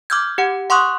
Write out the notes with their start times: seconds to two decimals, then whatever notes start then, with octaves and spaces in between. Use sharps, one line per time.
0.10 D6 E6 F6 G6 G#6
0.38 G4 F#5
0.70 F#5 C6 C#6 D#6 F#6